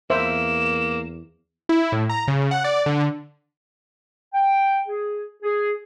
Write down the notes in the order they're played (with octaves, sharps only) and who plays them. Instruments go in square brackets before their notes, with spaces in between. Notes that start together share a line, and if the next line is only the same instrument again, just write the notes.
[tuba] E2 [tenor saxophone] A#3 [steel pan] C5 E5 [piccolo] E7
[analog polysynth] E4
A2
A#5
C#3
F#5
D5
D3
[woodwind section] G5
G#4
G#4